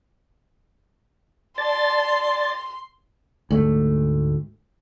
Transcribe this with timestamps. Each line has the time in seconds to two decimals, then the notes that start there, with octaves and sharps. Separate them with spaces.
1.58 D5 A5 C6 A6
3.50 D2 G#2 A3